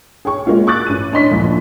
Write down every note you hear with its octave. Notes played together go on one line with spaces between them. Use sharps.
G#4 C#5 G5 C#6
G#3 A#3 C#4 F4 F#4
C#6 D6 F#6 A6
A1 D#7
D4 C#5 D#5 C6 B6
D2 A#2 F3